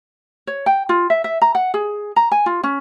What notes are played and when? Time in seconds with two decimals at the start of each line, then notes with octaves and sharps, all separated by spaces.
0.47 C#5
0.66 G5
0.89 F4
1.10 E5
1.24 E5
1.41 A#5
1.55 F#5
1.74 G#4
2.16 A#5
2.31 G#5
2.46 F4
2.63 C#4